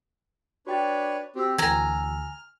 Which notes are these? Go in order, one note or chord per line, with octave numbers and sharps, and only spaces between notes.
D4 F#4 B4 C#5 G5 A6
C4 F#4 G4 E6
D2 E3 G#5 A#5 F6